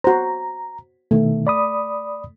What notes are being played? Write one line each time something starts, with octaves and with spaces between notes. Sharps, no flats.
F#4 C5 A#5
B2 D#3 A3
D5 B5 D#6